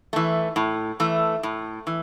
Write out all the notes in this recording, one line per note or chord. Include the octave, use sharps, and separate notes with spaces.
E3 A3
A2
E3 A3
A2
E3